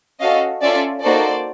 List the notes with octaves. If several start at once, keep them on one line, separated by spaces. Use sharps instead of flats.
C#4 F#4 A4 D#5 F5
C#4 F4 A4 D5 E5
A#3 D#4 F#4 A4 C5 D5